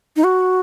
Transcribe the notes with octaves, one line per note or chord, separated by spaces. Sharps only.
D#4
F#4